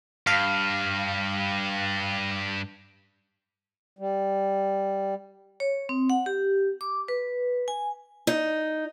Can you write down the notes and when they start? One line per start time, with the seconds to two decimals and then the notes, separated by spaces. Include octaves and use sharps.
0.27 G2 F5
3.99 G3
5.60 C#5
5.89 C4
6.10 F#5
6.26 G4
6.81 D6
7.08 B4
7.68 G#5
8.27 D#4